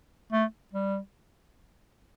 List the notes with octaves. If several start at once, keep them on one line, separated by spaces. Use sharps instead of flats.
A3
G3